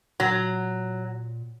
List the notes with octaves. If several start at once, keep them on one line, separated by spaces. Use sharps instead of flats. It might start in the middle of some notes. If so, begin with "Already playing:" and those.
A#2 F#3